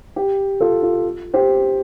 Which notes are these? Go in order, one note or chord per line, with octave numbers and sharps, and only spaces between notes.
G4
F4 A4
F4
G4 C5